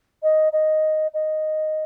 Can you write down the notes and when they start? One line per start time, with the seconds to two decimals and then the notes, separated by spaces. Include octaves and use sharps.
0.23 D#5
0.52 D#5
1.14 D#5